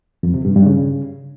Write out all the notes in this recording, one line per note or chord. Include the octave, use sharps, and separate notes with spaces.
F2
C3
G2
G2
C#3